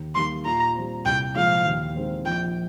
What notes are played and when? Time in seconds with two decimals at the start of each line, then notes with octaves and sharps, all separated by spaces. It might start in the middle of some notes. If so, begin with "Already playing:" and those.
Already playing: D#2
0.15 D#3 G3 A#3 C6
0.45 A#2 A#5
0.75 G3 C4
1.05 C2 G5
1.35 A#2 F3 G#3 F5
1.65 D#2
1.95 D#3 G#3 C4
2.25 A#1 G5